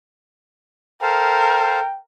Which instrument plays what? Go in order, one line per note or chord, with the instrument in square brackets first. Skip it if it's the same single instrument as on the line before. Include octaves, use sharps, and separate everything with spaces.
[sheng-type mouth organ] A4 C5 F5 [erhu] A#4 [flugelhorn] G5